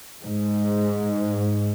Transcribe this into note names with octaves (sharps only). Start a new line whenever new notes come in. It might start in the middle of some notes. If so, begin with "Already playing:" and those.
G#2